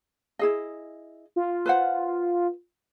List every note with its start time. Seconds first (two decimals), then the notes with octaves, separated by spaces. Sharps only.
0.39 E4 G#4 D#5
1.36 F4
1.66 B4 C5 F#5